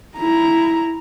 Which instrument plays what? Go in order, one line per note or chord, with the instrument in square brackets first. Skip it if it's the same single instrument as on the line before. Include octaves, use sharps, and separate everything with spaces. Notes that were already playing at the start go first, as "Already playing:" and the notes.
[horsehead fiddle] E4 A#5